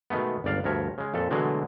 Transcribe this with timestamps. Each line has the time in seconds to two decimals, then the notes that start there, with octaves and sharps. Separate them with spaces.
0.10 B2 D#3 G#3 A3 B3
0.44 G1 C#2 D5 F5
0.64 D2 G2 F3 A#4 C#5 E5
0.98 C#3 G#3
1.14 F2 A#2 A4
1.30 B2 D3 E3 F#3 G#3 A3